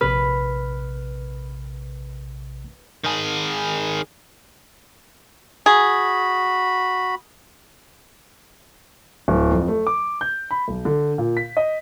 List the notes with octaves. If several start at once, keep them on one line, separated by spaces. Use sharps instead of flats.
A#1 C3 B4 F6
D#3 G#4
F#4 G#4 B5
D1
F2
A3
D6
G6
B5
B1
D3
A#2
B6
D#5